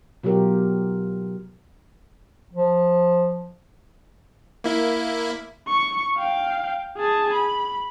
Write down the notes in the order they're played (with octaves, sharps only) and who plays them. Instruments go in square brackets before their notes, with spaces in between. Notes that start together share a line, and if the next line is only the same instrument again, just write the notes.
[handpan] B2 F#3 F4 G4 A#4
[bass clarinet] F3
[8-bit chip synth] A#3 E4
[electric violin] C#6
F5 G5
G#4 A5
B5